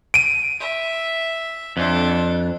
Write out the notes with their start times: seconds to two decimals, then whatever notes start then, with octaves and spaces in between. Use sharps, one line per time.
0.14 D7 D#7
0.60 E5
1.77 F2 D4 A4